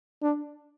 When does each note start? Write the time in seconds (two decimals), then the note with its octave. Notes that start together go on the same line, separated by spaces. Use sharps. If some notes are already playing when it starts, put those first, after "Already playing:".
0.23 D4